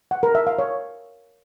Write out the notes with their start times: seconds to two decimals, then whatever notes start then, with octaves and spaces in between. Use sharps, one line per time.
0.11 F#5
0.23 A#4
0.35 E5
0.47 F5
0.59 C#5